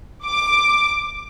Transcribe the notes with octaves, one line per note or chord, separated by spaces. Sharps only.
D6